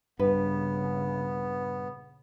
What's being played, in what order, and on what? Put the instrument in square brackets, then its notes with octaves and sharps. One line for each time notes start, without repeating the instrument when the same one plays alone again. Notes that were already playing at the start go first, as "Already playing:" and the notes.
[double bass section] A#1 C#3 [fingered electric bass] G2 [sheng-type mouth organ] B3 [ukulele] B4